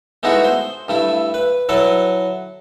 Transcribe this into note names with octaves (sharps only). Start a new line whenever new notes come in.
G#3 A3 B3 D#4 E4 F#4
C5
G2 A3 E4
B4
F#3 E4 A4 B4